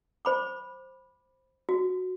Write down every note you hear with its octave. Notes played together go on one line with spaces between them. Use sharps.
C5 B5 D6
F#4